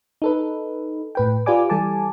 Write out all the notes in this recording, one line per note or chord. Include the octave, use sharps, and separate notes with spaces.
D#4 A4 B4
A2 B4 G5
F4 G4 B4 D5 G#5 D6
E3 G3 A4 G#5 A5 D6